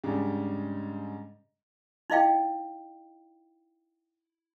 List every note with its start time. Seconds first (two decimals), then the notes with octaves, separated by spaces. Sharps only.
0.04 G#2 C#3 G3 D4
2.10 D#4 E4 D#5 F5 G5